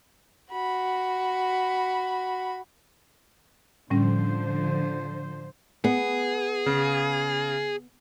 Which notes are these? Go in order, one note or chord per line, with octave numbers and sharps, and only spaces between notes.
F#4 B5
A2 D3 F3 G3 C#4 C5
B3 G#4
C#3